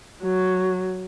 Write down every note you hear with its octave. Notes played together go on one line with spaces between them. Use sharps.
F#3